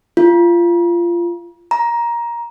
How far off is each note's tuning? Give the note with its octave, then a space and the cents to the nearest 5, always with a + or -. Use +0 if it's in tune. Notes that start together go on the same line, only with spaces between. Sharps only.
F4 -20
A#5 +15